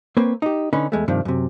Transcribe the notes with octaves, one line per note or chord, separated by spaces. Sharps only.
A#3 C4 B4 C#5
D#4 G4
D3 C#4 D#4 B4
E2 G#3 A3
G2 C3 D#3 F3
F#2 C3